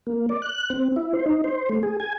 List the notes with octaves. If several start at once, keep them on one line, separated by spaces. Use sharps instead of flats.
A#3
D5
F#6
C4
E4
C5
D#4
C5
A3
G#4
G#5